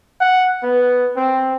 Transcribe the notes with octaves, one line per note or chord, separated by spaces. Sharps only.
F#5
B3
C4